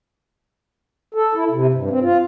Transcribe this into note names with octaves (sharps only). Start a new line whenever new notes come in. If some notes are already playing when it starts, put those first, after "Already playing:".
A4
E4
C3
G2
C4
F4